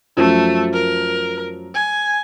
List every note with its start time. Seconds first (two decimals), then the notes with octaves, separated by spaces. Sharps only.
0.17 F#2 F3 A3
0.73 A#4
1.75 G#5